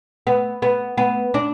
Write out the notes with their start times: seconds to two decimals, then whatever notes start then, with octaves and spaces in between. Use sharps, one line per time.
0.27 B3
0.62 B3
0.98 B3
1.34 D4